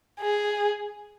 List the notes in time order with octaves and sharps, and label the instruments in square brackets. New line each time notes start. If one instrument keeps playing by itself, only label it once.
[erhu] G#4